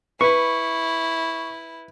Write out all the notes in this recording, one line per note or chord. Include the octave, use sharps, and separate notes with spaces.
E4 B4 C#6